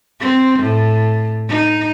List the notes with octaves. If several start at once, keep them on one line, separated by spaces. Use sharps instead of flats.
C4
A2
D#4